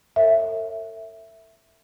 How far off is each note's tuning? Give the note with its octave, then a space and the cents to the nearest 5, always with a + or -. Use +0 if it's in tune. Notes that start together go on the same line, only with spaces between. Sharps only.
A4 +45 C#5 -20 E5 +0